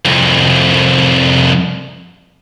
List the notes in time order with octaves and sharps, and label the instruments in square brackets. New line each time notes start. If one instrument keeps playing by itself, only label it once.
[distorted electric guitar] C2 F2